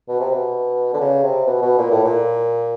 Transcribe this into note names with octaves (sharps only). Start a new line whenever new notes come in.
B2
C3
B2
D3
C#3
C3
B2
B2
A#2
A2
A#2